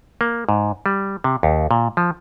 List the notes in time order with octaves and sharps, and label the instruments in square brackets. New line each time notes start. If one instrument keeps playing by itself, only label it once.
[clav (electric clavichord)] A#3
G#2
G3
C3
D#2
A#2
F3